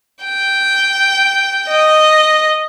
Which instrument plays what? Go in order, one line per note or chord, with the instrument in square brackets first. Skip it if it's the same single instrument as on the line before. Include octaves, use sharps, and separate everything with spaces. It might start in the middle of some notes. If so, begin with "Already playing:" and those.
[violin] G5
D#5